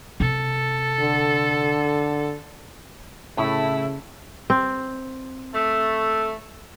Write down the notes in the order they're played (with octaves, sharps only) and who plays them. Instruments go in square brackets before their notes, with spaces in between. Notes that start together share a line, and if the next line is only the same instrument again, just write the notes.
[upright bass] C3 [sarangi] A4
[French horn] D3
[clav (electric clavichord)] A2 [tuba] C#3 [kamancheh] A3 E4
[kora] C4
[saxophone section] A3